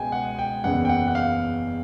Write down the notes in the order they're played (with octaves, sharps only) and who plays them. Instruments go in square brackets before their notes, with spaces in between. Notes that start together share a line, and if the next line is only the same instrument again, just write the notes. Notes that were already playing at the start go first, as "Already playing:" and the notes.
Already playing: [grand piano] C#2 B2 G#3 G5 G#5
F#5
G5
F#1 E2 C#3 F#5
G5
F#5
F#5
F5